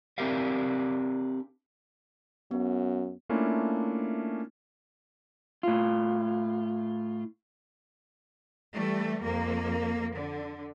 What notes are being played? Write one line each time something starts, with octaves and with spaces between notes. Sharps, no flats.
C4 D4 G4 A#4 E5 F5
F#2 B3
A3 A#3 C#4 D4 E4 F4
A2 F4
E3 G3 A3
F2 A#3
D3